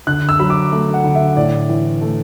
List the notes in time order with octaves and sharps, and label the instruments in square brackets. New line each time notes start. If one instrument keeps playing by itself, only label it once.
[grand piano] D3 F#6
E6
F#3 B5
D6
A3
F#5
D3
E5
A2 D5
E3
A3